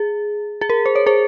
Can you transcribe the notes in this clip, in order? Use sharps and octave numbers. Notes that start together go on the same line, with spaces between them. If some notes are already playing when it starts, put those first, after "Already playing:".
Already playing: G#4
G#4
A#4
C5
C#5
G#4 C5